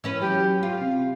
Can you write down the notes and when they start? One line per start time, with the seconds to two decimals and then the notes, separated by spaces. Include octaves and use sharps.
0.04 E3 C#4 B4
0.20 F#3 G4
0.63 F4 G4 F5
0.81 C3